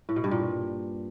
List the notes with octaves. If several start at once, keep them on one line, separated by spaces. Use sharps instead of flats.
A2
B2
G2
A#2